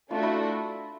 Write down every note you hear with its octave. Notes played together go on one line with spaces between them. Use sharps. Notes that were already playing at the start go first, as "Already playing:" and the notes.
A3 D4 F4 F#4
E4